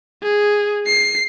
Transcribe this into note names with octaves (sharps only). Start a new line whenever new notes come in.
G#4
C7